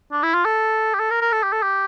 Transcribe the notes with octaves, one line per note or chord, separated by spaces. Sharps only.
D4
E4
F4
A4
G4
A4
A#4
A#4
A4
G4
A4
G4